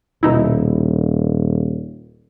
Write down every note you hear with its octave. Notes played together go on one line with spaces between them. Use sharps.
D#1 B2 D#4 E4